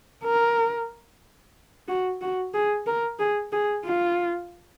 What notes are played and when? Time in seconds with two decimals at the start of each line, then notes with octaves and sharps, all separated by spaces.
0.24 A#4
1.88 F#4
2.21 F#4
2.54 G#4
2.87 A#4
3.19 G#4
3.52 G#4
3.85 F4